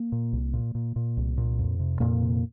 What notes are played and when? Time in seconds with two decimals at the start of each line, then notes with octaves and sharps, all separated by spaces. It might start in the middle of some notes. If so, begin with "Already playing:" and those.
Already playing: A#3
0.12 A#2
0.33 C2
0.54 A#2
0.75 A#2
0.96 A#2
1.17 C2
1.38 A#2
1.59 F2
1.80 C3
2.00 F2 A#2 A#3
2.21 C3